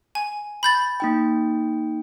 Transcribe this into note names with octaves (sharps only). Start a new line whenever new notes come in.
G#5
B5 G6 A6
A#3 D#4 G5